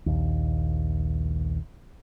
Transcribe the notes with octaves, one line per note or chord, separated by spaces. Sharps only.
A#1 D#2